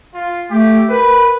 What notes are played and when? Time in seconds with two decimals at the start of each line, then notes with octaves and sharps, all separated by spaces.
0.14 F4
0.50 A3 G4
0.89 A#4 B4